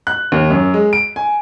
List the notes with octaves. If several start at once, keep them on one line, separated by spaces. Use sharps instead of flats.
F#6
D#2
F#2
G#3
D7
G#5